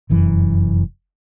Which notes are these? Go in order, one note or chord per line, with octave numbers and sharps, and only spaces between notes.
F1 F#2 E3